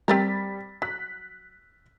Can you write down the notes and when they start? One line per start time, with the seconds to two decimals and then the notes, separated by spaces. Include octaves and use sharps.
0.08 G3 C4 G4 A#4 A6 B6
0.82 F#3 F#6 B6